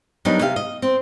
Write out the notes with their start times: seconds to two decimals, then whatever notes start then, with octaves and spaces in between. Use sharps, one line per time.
0.25 F#3 G3 A#3 B3 D4 D#4
0.41 C3 G4 F5
0.56 D#5
0.82 C4